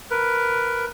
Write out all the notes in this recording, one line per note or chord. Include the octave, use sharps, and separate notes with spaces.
A#4 B4